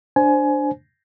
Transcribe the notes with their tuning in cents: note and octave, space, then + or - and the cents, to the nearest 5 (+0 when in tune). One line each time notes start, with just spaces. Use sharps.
D4 +0 C5 +0 G#5 +20